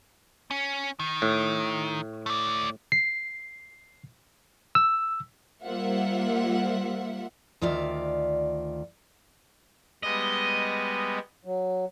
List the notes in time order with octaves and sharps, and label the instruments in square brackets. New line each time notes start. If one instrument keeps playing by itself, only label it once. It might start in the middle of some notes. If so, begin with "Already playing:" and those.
[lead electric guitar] C#4
D#3
[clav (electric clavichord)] A2
[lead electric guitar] A3 D5
[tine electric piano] C7
E6
[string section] G3 A#3 F4 C5 E5 F#5
[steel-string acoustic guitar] D2 D#3 F4 D5 E5
[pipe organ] G3 G#3 B3 [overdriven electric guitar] D#5
[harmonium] F#3